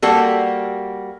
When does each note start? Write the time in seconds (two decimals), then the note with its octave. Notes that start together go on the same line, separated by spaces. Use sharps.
0.02 G3 A#3 F#4 A4